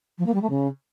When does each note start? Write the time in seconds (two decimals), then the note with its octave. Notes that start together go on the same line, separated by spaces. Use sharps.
0.18 F3
0.26 A#3
0.34 G3
0.41 A3
0.49 C#3